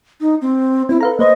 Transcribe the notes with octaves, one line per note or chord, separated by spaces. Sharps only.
D#4
C4
C4 E4
A4 B4 F5 A#5
A#3 B4 C5 D#5